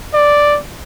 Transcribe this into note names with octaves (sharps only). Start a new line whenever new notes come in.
D5